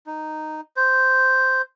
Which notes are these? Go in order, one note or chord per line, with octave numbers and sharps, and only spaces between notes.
D#4
C5